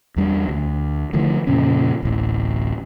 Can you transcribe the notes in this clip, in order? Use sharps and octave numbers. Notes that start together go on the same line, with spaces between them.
E2 G3 D4
D2
D3 E3 F3 A3
F2 A#2 C#3 C#4
D1 A1